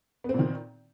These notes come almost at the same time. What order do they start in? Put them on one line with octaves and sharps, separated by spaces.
B3 C4 A#2 D#3